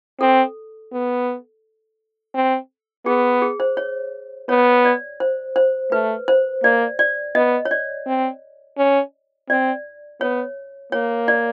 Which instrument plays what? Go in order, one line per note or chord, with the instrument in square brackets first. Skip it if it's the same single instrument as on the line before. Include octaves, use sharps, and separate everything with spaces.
[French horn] C4 [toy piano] A4
[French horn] B3
C4
[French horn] B3 [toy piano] G#4
[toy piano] G#4
C5
C#5
[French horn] B3 [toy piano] C#5
[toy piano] D5
C5
C5
[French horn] A3 [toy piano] B4
[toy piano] C5
[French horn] A#3 [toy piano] D5
[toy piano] D5
[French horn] B3 [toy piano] D#5
[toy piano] C#5
D5
[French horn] C4
C#4
[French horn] C4 [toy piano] D5
[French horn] B3 [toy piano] C#5
[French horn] A#3 [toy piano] C#5
[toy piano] D5